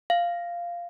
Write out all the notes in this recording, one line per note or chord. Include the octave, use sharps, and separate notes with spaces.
F5